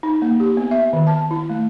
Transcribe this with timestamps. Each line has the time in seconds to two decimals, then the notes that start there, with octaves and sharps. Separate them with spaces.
0.03 D#4
0.22 A#3
0.40 G4
0.57 B3
0.71 E5
0.93 D#3
1.07 A5
1.31 E4
1.50 A3